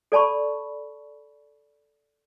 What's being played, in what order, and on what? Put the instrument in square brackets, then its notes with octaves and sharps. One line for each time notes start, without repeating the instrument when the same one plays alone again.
[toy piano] A4 D5 A5 B5 C#6